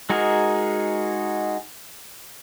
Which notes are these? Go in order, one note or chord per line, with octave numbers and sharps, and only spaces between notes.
G#3 D#4 F#4 G#4 A#4